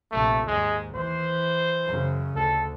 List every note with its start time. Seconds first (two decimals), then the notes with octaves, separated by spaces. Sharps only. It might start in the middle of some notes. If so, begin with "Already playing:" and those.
0.11 A#1 C3 A3
0.47 D#2 G#2 G#3
0.95 E3 C5
1.86 F#2 C#3
2.36 D2 A4